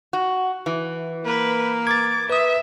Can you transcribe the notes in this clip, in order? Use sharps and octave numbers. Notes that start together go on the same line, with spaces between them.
F#4
E3
A#3 B4
D6 G#6 A6
B4 E5 D#6